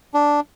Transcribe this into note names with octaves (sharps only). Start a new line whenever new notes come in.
D4